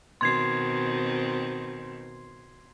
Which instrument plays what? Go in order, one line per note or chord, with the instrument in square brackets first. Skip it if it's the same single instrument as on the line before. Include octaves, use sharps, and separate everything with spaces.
[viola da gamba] B2 D#3 C4 [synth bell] C6 G#6 C7